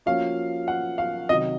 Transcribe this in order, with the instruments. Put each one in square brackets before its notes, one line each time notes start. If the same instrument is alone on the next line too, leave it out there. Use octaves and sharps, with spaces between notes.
[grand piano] F3 A#3 C#4 F#4 [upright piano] F5
[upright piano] F#5
F5
[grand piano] C3 D#3 F#3 [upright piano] D#5